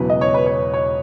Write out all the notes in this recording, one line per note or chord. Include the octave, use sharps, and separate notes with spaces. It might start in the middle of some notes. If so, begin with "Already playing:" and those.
Already playing: E1 E2 C#3 F#3 B4
D#5
C#5
B4
C#5
C#5